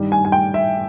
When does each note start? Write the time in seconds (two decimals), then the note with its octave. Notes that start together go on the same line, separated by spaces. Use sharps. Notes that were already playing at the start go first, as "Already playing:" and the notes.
Already playing: G2 D#3 G3
0.12 G#5
0.25 G#5
0.32 G5
0.54 E5